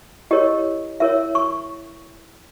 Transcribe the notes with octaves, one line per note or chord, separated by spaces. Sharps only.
E4 G4 A#4 C#5 D#5
E4 A#4 C#5 E5
C#6